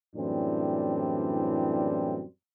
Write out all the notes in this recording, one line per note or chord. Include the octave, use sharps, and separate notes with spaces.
F#2 A2 E3 G3 C4 D4